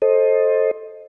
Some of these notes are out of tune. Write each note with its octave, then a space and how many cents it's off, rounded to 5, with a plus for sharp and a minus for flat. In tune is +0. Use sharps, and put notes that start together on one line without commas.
A4 +0 C5 +20 D#5 +0